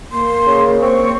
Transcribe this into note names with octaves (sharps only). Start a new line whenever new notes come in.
A#3 C6
C#3
C4 C#6